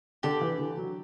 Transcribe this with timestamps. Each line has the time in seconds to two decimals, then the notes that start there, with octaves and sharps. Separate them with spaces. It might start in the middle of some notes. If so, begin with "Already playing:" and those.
0.23 D3 G4 D5 A5
0.41 E3
0.59 D3
0.77 F#3